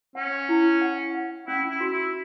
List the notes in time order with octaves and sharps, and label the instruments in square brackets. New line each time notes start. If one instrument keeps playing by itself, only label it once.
[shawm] C#4 [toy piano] F#5
[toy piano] E4
F#5
F#5
[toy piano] C#4 [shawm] E4
[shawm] E4
[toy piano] F#4
[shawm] E4